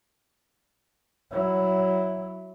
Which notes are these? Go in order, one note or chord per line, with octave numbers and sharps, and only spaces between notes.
F#3 E4